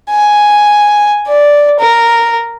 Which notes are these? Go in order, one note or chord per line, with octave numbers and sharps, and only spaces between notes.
G#5
D5
A#4